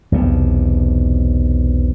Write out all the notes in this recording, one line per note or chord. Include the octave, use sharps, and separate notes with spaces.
B1 E2 C3